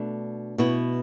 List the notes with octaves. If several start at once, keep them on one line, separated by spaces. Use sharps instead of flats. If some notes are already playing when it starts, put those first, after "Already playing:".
Already playing: B2 A3 D4
B2 B3 E4